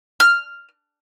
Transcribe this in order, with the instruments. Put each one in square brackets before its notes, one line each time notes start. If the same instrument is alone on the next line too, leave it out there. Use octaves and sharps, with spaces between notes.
[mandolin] F6